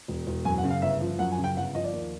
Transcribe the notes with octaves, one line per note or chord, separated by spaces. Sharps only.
E1
E1
F#2 G#5
F#5
C#3
F5
G1 E5
F3
F#2 F#5
G#5
C#3
G5
G1 F#5
F3 D#5
D5
D#2